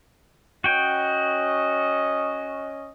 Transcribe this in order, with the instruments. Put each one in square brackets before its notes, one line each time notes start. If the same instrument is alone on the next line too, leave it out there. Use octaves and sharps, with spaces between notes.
[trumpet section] C#4 D#5 [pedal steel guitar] F#4 G5